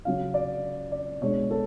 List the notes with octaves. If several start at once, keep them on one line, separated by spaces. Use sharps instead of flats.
C#3 F#3 C#4 F5
D5
D5
B2 G#3 D4 C#5
A4